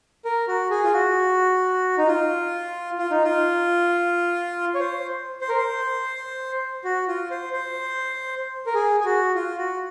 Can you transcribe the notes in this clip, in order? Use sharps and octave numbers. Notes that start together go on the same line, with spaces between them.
A#4
F#4
G#4
F4
F#4
D#4
F4
F4
D#4
F4
C#5
C5
C5
A#4
C5
F#4
F4
C5
C5
A#4
G#4
G#4
F#4
F4
F#4